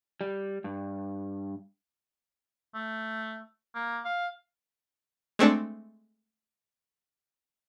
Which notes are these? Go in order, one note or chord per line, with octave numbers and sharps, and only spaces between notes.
G3
G2
A3
A#3
F5
G#3 A3 C4 D4